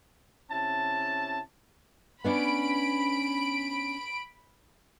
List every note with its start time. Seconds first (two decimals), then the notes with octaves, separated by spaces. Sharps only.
0.51 C3 C#4 E4 A5
2.24 B3 C#4 D4 B5 D7